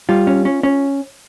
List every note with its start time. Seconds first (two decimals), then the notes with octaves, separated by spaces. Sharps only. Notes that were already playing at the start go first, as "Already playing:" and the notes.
0.09 G3 F4
0.27 C#4
0.45 C#4
0.63 C#4